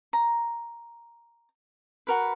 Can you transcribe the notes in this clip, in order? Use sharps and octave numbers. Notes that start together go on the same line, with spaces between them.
A#5
F#4 A#4 B4